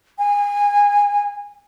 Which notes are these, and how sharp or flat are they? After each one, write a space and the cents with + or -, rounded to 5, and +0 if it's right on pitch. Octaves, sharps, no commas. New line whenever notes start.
G#5 -25